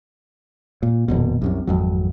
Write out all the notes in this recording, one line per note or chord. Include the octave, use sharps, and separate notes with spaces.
A#2
D#1 F2 B2
C2 F#2 C3
G#1 F2 F#3